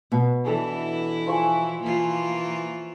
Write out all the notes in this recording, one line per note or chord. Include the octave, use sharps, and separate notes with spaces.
B2
E3 D4 E4 A4
F3 C#5 G#5
E3 A#3 F4